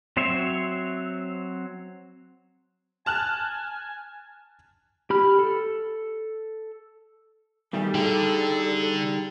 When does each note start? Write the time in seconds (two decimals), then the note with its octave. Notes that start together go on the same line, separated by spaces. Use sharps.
0.17 F#3 C4 C5 C#5 E5
3.06 G#5 A5 F6 F#6
5.10 G4 B5 F6
5.39 A4
7.73 B2 D#3 G3 A3 G#5
7.95 D3 D#4 G#4 A4 G5